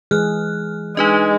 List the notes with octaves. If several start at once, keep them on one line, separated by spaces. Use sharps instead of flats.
E3 G#3 G#4 F6 F#6
G#3 D4 D#4 B4 D#5